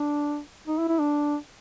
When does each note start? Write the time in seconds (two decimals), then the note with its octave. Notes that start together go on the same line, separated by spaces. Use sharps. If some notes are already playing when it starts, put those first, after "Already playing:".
Already playing: D4
0.68 D#4
0.78 E4
0.89 E4
0.99 D4